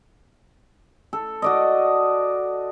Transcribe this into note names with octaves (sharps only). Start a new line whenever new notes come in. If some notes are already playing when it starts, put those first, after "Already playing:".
A4
F#4 D5 D#5